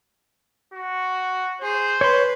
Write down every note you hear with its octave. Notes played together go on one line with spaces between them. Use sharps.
F#4
G#4 C5
B4 C#5 C6